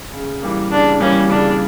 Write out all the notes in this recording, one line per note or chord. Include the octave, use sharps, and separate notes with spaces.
C#3
E3 G3 A#3
C#3 D4
E3 G3 A#3 C#4
C#3 D4